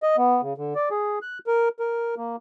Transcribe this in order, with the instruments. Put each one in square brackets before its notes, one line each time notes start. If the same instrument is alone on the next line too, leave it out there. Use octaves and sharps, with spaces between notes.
[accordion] D#5
B3
C#3
D3
D5
G#4
F#6
A#4
A#4
A#3